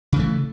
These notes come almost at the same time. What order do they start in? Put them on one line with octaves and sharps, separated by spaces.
C#3 E3 A3